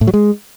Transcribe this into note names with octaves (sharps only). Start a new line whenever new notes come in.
A2
F#3
G#3